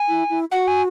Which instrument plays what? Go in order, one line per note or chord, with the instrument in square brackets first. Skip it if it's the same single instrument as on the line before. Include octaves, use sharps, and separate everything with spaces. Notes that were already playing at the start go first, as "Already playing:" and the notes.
Already playing: [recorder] G#5
[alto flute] E4
E4
[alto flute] F#4 [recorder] F#5
[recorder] G#5